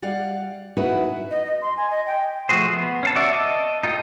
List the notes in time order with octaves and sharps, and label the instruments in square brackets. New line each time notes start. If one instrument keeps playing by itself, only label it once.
[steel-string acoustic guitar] G3 D5 F5 F#5
C#4 D#4 E4 F#4 B4 F#5
[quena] D#5
D#5
C6
G#5
D#5
G5
[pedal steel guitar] F3 A3 F#4 G#4 C5
B3
C#4 F5 A5
F#4 D5 E5
D#5 A5
D#4 F4 A4 G5 D#6